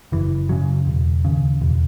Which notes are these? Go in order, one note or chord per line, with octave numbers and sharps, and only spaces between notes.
F#1 E3
F#2 C#3 F#3
E1
D#2 C#3
E1